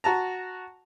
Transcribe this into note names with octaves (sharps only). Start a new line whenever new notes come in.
F#4 A5 A#5